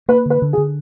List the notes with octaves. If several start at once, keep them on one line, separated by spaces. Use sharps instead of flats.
A#3 B4
D3 B4
D3
G#4
D3